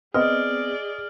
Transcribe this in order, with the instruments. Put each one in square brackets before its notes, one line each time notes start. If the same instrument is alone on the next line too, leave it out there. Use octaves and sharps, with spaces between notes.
[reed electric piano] B3 C4 [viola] G#4 D5 [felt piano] D#5 [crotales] F6